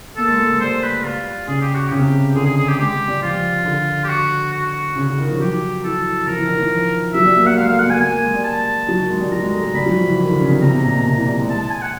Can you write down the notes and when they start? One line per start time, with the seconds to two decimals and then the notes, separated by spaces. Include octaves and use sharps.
0.17 A#3 A4
0.28 G#3
0.39 A3
0.50 G#3
0.60 G3 C5
0.83 B4
1.04 G3 F4
1.48 C#3 G#4
1.61 G4
1.75 F#4
1.89 C#3 G4
1.99 C3
2.07 C#3
2.35 D3 G#4
2.46 G#4
2.57 G#4
2.68 G4
2.79 G#3 G4
2.94 G#3
3.08 G3
3.22 F3 F4
3.65 D3
4.04 G4
4.09 F#4
4.52 F#4
4.96 C#3
5.07 C#3
5.18 D#3
5.30 F3
5.39 F#3 G4
5.84 E3 A4
6.27 F3 A#4
6.38 E3
6.48 D#3
6.60 F3
7.14 F#3 E5
7.25 G3
7.36 A#3
7.46 A#3 F#5
7.57 G#3 F5
7.69 A3 F5
7.79 F#5
7.86 A#3 G#5
8.00 A#3 G#5
8.22 G#3
8.34 G3
8.44 A5
8.88 F#3
8.99 D#3
9.10 G#3
9.21 G3
9.31 F#3 A#5
9.42 G#3
9.54 A3
9.64 G#3
9.75 G3 B5
9.86 F#3
9.97 F3
10.07 E3
10.18 D#3
10.30 D3
10.41 C#3
10.51 C3
10.62 C3 A#5
10.74 B2
10.84 A#2
10.94 B2
11.06 C3
11.17 E3
11.27 G3
11.39 G#3
11.49 G#3 A5
11.60 A5
11.71 G#5
11.82 F#5